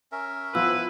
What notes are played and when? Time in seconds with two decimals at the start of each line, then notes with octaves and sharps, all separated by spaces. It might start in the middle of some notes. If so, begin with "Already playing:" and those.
0.12 C#4 A#4 E5
0.55 F3 B3 E4 F4 B4 E6